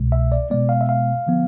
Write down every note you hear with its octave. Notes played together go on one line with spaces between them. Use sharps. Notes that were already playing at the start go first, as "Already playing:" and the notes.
Already playing: C2 B2 G#3
E5
D5
B2 G#3 B3 D5
F5
E5
F5
D3 F3 B3